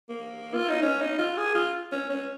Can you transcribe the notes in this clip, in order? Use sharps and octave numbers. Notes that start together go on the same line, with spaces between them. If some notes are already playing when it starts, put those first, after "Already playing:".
A#3
F4
D#4
C#4
D#4
F4
G#4
F4
C#4
C#4